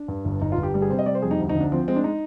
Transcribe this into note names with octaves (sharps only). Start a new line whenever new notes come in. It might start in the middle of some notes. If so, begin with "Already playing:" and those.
Already playing: D4
G2
G1
G1 D#4
F4
G1
G4
G3 G4
G#4
C3 C5
D#5
G3 D5
C5
F2 G#4
D#4
D2
D#4
D2
D4
F3 C4
G#3 C4
D4
D#4